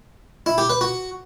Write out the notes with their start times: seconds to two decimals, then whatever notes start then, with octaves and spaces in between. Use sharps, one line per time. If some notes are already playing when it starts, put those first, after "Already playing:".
0.46 E4
0.58 G4
0.70 B4
0.81 F#4